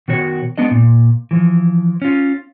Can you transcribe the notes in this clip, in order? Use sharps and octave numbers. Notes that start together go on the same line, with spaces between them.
B2 D#3 F#4 C#5
G#3 B3 D4 D#5
A#2
E3 F3
C#4 F4